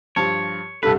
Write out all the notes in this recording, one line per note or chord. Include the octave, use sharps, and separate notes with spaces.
G2 F3 C#5 A5
C2 G2 A4 B4